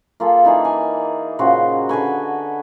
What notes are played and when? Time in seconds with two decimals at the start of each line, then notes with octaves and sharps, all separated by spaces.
0.20 A#3 F4 G#4 A4
0.45 E3 D#4 G#4 D5
0.65 G#5
1.39 A#2 C#3 F#4 C5
1.89 D3 B4 G#5 C#6